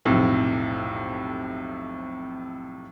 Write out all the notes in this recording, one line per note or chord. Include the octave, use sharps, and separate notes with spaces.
B1 F2 A2 C3